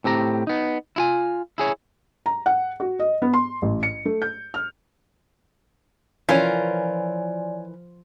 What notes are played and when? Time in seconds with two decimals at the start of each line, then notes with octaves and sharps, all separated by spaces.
0.04 A2 C4 G4 A#5
0.47 B3 D#4
0.96 E4 F4 G#5
1.58 E4 G#4 C#5
2.26 A#5
2.46 F#5
2.80 F#4
2.99 D#5
3.22 B3
3.33 C6
3.62 A1
3.83 C#7
4.05 A3
4.22 G6
4.54 F6
6.29 E3 F3 C#4 F4 A#4 D5 G#5